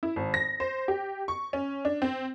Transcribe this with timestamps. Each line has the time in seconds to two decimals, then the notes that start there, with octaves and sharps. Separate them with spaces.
0.03 E4
0.16 G#1
0.34 A#6
0.60 C5
0.88 G4
1.28 C#6
1.53 C#4
1.85 D4
2.02 C4